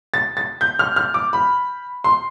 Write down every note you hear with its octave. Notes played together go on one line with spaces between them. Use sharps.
A6
A6
G6
F6
F6
D6
B5
C6